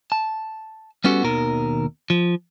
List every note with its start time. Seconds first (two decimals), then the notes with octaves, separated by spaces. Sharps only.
0.12 A5
1.04 G3 B3 C#4 F#4 G4 A4
1.24 D#2 B2 D#3 A#4
2.10 F3